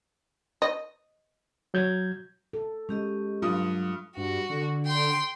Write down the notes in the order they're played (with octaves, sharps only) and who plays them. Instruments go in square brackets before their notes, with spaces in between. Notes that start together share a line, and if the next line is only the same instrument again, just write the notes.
[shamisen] D#5
[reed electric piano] F#3 G6 G#6
[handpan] A4
[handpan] G#3 [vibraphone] C#4 G4 D#5
[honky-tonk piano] G2 D#6 [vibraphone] F#3 [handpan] F4
[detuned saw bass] G2 [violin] F#4
[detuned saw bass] D3
[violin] G5 C6